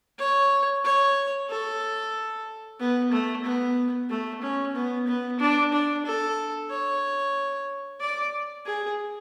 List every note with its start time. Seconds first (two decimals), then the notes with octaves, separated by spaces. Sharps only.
0.19 C#5
0.84 C#5
1.49 A4
2.80 B3
3.12 A3
3.45 B3
4.10 A3
4.42 C#4
4.75 B3
5.08 B3
5.40 D4
5.73 D4
6.06 A4
6.71 C#5
8.01 D5
8.66 G#4